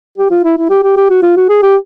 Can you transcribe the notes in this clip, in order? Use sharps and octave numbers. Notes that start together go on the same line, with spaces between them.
G4
F4
E4
E4
G4
G4
G4
F#4
F4
F#4
G#4
G4